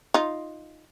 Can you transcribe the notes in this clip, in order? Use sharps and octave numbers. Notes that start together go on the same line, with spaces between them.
D#4 F4